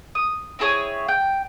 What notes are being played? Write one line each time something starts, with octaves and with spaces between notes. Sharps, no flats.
D#6
C4 E4 G#4 C#5
G5